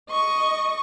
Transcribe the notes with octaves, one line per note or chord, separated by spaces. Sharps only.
D#5 C#6